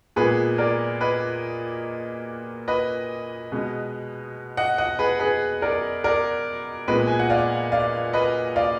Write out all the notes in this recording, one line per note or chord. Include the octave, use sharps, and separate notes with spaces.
A#2 G#3 B3 G#4 B4
A#4 D5
B4 D#5
B4 D#5
B2 G#3 B3
D#5 F#5
D#5 F#5
G#4 B4
G#4 B4
A#4 D5
A#4 D5
A#2 G#3 B3 B4 D#5
G#5
F#5
D5 F5
D5 F5
B4 D#5
D5 F5